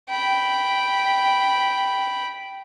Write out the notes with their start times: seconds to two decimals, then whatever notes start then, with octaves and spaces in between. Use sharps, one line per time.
0.10 G5 B5